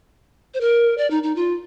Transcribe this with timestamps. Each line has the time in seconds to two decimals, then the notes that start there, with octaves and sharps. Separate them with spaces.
0.54 C5
0.61 A#4
0.98 D5
1.11 D#4
1.23 D#4
1.36 F4